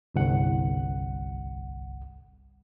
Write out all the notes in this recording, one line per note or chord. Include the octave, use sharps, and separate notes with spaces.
G1 C2 F#5